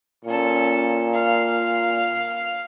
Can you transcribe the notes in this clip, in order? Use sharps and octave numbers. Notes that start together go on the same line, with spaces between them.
A#2 C#4 A4
F5